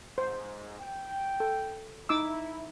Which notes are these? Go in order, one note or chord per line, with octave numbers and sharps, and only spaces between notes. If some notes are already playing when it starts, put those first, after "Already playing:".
G#2 C5
G5
A4
D#4 E4 D6 E6